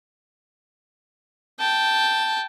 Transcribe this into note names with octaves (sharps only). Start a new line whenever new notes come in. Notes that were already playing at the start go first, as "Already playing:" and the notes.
G5 A5